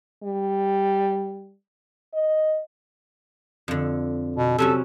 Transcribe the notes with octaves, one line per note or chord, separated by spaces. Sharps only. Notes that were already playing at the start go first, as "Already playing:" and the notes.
G3
D#5
F2 D3
B2
C3 F#3 C#4 A4